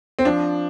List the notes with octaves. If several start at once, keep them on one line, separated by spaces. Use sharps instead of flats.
C4
F3 D4